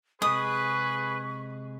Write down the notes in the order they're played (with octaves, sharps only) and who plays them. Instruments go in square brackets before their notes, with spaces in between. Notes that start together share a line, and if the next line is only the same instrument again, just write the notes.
[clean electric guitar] C3 G#3 [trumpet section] G#4 B4 [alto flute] C#6 [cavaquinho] D#6